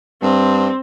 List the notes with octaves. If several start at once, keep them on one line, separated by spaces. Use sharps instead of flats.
G2 C4